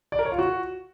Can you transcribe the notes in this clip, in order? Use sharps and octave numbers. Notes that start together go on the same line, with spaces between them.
D5
A#4
C#5
F4
F#4